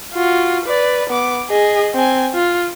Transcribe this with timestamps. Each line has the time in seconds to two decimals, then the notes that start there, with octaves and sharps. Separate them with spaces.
0.14 F4 F#4
0.66 B4 D5
1.10 B3 D6
1.50 G#4 D#5
1.94 C4 G#5
2.34 F4